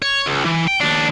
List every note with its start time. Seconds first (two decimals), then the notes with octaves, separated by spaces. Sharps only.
0.02 C#5
0.26 C#2
0.46 E3
0.68 G5
0.81 D#2 D4